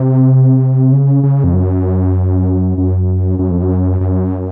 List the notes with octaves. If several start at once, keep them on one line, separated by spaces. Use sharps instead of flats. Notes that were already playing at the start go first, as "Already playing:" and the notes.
Already playing: C3
C#3
C#3
F2
F#2
F#2
F#2
F2
F#2
F#2